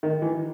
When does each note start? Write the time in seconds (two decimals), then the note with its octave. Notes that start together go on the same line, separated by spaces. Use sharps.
0.03 D#3
0.22 E3